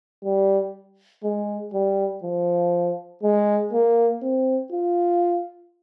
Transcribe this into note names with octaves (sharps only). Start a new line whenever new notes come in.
G3
G#3
G3
F3
G#3
A#3
C4
F4